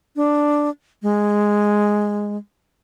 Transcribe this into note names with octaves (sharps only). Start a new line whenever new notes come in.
D4
G#3